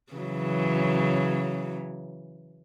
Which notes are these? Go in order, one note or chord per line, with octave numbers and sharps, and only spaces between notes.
C#3 E3 F#3